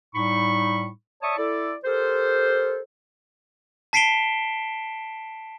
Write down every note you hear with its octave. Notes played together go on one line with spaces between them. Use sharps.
A2 G3 D#4 B5 C#6
C#5 D5 E5 A5 C#6 D#6
E4 A4 D5
G4 A4 A#4 C5
A5 B6 C7 D7 E7 G7